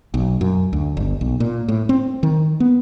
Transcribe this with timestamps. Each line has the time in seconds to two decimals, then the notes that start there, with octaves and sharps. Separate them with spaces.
0.14 B1
0.41 F#2
0.73 D2
0.97 G1
1.21 B1
1.40 A#2
1.68 A2
1.89 C4
2.23 D#3
2.60 B3